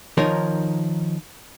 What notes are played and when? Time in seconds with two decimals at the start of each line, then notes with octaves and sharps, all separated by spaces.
0.17 D#3 F3 D#4 A#4 C#5